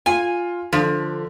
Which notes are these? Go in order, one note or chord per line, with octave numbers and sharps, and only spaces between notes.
F4 G#5
D3 F3